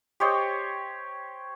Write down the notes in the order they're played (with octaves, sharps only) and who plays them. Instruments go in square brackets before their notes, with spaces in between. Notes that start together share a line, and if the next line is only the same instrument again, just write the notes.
[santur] G4 C5 C#5 D#5